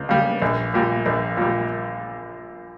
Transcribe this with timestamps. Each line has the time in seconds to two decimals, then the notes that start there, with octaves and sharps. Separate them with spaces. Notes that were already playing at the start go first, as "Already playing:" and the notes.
Already playing: C#2
0.09 C#3 G3
0.42 A#1
0.74 A#2 G3
1.06 A#1
1.37 A#2 G3